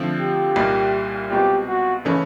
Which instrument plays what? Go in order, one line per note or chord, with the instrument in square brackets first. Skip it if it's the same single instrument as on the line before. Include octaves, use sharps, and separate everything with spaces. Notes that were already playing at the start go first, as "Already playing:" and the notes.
Already playing: [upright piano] D3 F3 A3 C4 F4
[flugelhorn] G4
[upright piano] C2 A#2 G3 A#3 D#4
[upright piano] C2 B2 G#3 C4 F4 [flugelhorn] G4
[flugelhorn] F#4
[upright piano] C#3 E3 A3 C#4